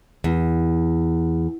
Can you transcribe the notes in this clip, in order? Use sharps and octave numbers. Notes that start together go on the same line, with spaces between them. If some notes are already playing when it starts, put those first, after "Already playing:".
E2